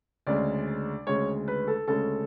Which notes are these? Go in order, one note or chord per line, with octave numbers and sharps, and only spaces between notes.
D2 C#3 G#3 D5
D2 C#3 G#3 C#5
B4
A4
D2 C#3 G#3 A4